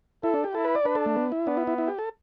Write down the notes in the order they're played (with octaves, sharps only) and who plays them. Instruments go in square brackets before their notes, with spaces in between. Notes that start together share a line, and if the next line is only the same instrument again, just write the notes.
[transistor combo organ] E4 [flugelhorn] A4
[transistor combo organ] D4
G4
[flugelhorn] E4 [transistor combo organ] A4
[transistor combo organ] B4
D5
[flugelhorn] D4 [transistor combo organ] B4
[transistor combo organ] A4
A3
B3
E4
[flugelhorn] B3 [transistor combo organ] D4
[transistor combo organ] E4
E4
E4
G4
A4